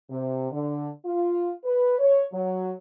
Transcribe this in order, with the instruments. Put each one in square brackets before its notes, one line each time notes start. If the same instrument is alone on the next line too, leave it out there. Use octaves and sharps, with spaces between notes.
[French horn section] C3
D3
F4
B4
C#5
F#3